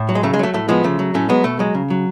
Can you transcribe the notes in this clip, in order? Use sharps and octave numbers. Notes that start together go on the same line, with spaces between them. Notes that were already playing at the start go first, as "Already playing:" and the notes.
Already playing: A2
F#3
G#3
C#3 A3
G#3
F#3 A3
A2 A3
F3 G#3 B3
C#3 A3
F#3
A2 A3 C#4
F#3 G#3 B3
B2 A3
F#3 G#3
C#3
F#3